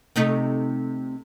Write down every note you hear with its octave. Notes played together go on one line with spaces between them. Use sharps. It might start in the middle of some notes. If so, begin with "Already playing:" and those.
C3 A3 D#4